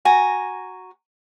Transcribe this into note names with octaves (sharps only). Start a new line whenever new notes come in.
F#4 G#5 A#5